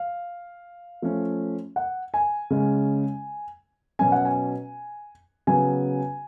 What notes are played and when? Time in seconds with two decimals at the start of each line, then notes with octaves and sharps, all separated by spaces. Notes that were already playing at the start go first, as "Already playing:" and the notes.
Already playing: F5
1.02 F3 A3 C#4
1.76 F#5
2.14 G#5
2.50 C#3 G#3 C#4
3.99 B2 F#3 C#4 G#5
4.12 F#5
4.25 G#5
5.47 C#3 F#3 B3 G#5